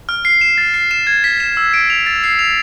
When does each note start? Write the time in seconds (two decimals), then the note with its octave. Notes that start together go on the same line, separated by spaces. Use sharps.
0.09 F6
0.25 C7
0.41 E7
0.58 A6
0.74 C7
0.91 E7
1.07 G#6
1.24 B6
1.40 E7
1.57 E6
1.74 D7
1.90 F7
2.06 A6
2.24 C7
2.39 F7